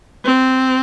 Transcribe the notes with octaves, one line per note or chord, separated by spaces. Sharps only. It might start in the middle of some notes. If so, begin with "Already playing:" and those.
C4